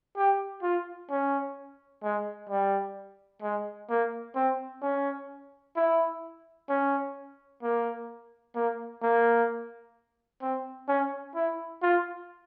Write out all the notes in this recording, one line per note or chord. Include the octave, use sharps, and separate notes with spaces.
G4
F4
C#4
G#3
G3
G#3
A#3
C4
C#4
E4
C#4
A#3
A#3
A#3
C4
C#4
E4
F4